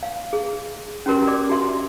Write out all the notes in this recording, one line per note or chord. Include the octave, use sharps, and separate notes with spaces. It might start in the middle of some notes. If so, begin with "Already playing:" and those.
F5
G#4
C#4 F#4 G4 A#4 C6
D5 D6
F#4 G4 E5 C6